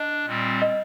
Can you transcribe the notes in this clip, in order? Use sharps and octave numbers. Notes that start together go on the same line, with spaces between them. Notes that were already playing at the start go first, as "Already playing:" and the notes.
Already playing: D4 D#5
A#2 G3 C4
D#5